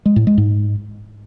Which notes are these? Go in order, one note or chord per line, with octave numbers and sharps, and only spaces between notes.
G#3
A2
G#3
G#2